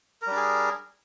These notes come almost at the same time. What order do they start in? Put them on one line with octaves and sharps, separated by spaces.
A#4 G3 D4 G#4